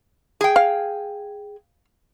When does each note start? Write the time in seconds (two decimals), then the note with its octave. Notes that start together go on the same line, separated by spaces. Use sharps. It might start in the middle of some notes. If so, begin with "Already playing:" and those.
0.41 G#4 G5
0.56 F5